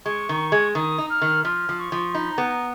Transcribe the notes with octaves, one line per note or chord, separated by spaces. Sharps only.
G#3 C#6
D#3
G#3
D#3 D#6
D#4
F6
D#3
F3 F6
F3
C#6
F3
D#4 B5
A#5
B3
A#5